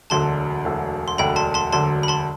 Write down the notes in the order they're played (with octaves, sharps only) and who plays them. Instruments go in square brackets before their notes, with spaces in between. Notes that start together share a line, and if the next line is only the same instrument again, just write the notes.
[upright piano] E1 D2 D3 F#3 [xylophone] A5 C6
[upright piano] E1 D2 D3 F#3
[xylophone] C6
[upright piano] E1 D2 D3 F#3 [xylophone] G5 B5
[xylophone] A5 C6
A5 C6
[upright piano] E1 D2 D3 F#3 [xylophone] A5 C6
[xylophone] B5
A5 C6